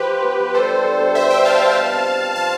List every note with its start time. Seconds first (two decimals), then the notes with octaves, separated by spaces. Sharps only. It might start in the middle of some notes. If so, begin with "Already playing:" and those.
Already playing: F3 G4 B4
0.09 F4
0.24 B3
0.39 F3
0.54 G3 A4 C5
0.70 D4
0.85 G3
1.00 B2
1.15 D4 C5 E5
1.30 D4 E5 G5
1.45 D4 F5 A5
1.60 B2
1.76 F3
1.90 C3
2.05 C3
2.21 C3
2.36 F3 F5 A5